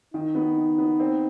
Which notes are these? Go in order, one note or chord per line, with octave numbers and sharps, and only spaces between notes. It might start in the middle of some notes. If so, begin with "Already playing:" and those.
D#3 D#4
B3
D#3
B3
C4